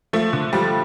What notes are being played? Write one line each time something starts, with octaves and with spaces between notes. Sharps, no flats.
F3 A3
D3
F3 G3